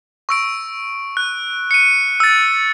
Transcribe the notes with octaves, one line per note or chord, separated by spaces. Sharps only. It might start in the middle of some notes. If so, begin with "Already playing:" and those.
C#6 E6 D7
F#6
C#7 D#7
E6 A6